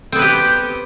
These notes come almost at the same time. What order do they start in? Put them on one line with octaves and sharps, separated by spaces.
C4 B3 B4 G4